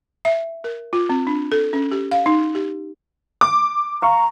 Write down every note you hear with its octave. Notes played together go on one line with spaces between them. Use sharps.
E5
A#4
F4
C4
D4
A4
C#4
G4
F5
D#4
G4
D6
F5 A#5 C#6